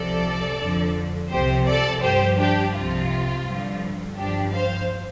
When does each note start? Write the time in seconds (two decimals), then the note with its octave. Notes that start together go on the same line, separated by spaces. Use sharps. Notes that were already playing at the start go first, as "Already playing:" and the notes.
Already playing: C2 C3 F3 A4 D5
0.59 F2 D3 F3
1.31 C2 C3 F3 G4 C5
1.67 A4 D5
2.02 G2 F3 G4 C5
2.38 D4 G4
2.74 C2 C3 F3 F4
3.45 G2 D3 F3
4.17 G2 F3 D4 G4
4.53 C5 F5